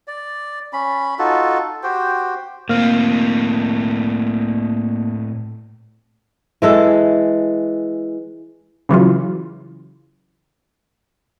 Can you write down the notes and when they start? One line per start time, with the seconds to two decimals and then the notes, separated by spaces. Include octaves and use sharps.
0.07 D5
0.73 C#4 B5
1.19 D#4 F4 F#4 A4
1.83 F#4 G4 C5 G5
2.69 A2 A#3 C4 F6
6.62 E3 G#3 A4
8.89 C#3 E3 F#3 F4